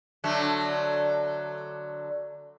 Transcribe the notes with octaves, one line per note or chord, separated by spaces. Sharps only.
D3 F#3 A3